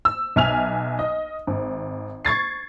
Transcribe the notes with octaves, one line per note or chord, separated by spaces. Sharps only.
E6
B1 E5 G#5 F6 F7
D#5
G#1
C#6 G#6 A6 C7